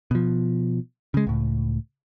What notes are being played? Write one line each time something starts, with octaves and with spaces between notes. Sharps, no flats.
B2 F3
C#3 G#3
C#2 A2